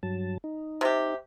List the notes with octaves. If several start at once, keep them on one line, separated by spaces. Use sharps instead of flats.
G2 F#3 A5
D#4
C3 G4